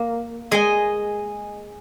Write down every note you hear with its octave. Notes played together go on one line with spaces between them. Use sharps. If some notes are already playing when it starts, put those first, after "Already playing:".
Already playing: A#3
G#3 G#4 D#5 G#5